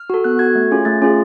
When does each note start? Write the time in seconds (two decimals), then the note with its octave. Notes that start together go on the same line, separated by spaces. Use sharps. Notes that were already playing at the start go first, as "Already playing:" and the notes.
Already playing: F6
0.10 F#4 A4
0.24 B3 F#6
0.39 F#4 A4 G#6
0.55 A3
0.71 C#4 F4 G#4
0.85 A3 A6
1.02 C#4 F4 G#4